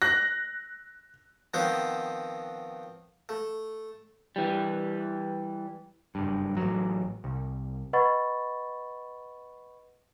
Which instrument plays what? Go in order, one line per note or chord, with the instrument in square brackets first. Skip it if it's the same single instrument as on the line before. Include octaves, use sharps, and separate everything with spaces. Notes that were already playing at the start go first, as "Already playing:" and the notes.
[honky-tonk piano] F#6 A#6
[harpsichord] D#3 F3 B3 C4 C5 F#5
A3
[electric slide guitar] E3 G3
[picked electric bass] F#1 G2
A1 F#3
C2
[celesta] B4 D#5 F#5 B5 C#6 A6